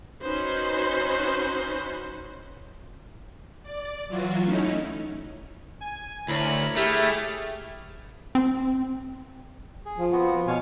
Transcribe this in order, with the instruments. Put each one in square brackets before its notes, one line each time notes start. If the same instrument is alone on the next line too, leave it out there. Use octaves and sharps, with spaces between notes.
[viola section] C#4 D#4 F#4 B4 C5
[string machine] D5
E3 F#3 F4 F#4
A3 C#4 D#4 E4
[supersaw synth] G#5
[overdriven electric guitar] D2 [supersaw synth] E4 A#4 C#5 [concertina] B5
[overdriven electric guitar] A3 [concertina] E4 E5 F6 [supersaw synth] G4 G#4
[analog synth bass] C4
[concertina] G#4
[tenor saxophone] F3
[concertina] B3 C4 F#4
[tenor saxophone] B2 [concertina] C#5 F5 G#5